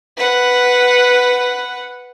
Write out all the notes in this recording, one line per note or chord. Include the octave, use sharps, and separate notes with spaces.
B4 F#5